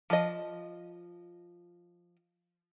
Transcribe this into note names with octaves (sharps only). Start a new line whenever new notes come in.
F3 D#5